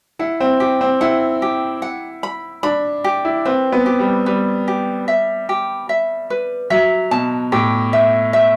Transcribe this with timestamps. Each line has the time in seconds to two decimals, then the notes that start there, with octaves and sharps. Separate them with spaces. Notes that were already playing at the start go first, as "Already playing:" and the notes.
0.19 E4 F#5
0.40 C4
0.60 G4
0.81 C4
1.01 E4 F#5
1.42 G4
1.82 F#5
2.23 B5
2.63 D4 B5
3.04 G4
3.25 E4
3.45 C4 B4
3.72 B3
3.86 G4
3.99 G3
4.26 G3 B4
4.68 G4
5.08 E5
5.49 G4
5.89 E5
6.30 B4
6.70 F#3 E5
7.11 B2 A5
7.52 A2 G4
7.93 E5
8.33 E5